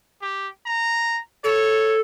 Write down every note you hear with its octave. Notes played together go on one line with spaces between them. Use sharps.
G4
A#5
A4 C#5